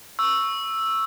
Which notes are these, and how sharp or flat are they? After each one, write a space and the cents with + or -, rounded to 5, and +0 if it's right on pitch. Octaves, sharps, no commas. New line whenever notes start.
C#6 +0 E6 +0